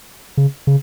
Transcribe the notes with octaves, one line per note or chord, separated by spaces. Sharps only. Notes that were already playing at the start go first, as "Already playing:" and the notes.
C#3
C#3